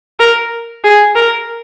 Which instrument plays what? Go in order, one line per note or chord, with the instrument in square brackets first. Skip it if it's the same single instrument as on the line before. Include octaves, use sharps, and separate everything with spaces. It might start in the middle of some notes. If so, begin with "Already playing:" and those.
[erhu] A#4
G#4
A#4